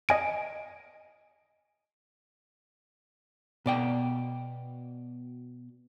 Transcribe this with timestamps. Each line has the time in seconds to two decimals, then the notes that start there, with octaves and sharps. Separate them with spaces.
0.09 D#5 G#5 D7
3.66 B2 D5 G5